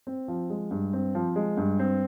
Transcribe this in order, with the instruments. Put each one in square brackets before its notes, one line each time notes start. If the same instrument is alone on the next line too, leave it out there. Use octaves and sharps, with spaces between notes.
[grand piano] C4
F3
G#3
G2
C4
F3
G#3
G2
C4